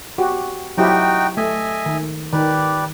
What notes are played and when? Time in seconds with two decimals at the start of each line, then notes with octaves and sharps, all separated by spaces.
0.18 F#4 G4
0.78 F#3 D#4 E4 F#4 G4 G5
1.37 A3 D#5 E5 G#5
1.86 D#3
2.33 D#3 G4 B4 D5